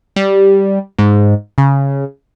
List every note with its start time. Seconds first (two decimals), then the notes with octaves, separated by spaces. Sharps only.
0.16 G3
0.99 G#2
1.58 C#3